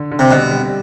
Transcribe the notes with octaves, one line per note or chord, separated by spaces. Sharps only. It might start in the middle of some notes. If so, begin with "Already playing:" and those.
Already playing: D3
D3
C3
B2 G3
G3